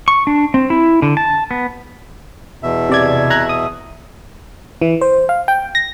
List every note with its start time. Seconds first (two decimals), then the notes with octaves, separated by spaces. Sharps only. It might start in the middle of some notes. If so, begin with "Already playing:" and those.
0.08 C#6
0.27 D4
0.54 C4
0.70 E4
1.02 D3
1.17 A5
1.51 B3
2.63 E2 B2 E5
2.90 C3 D5 G#6
3.30 A#5 F#6 G#6
3.49 D#6
4.82 E3
5.01 C5
5.29 F5
5.48 G5
5.75 A#6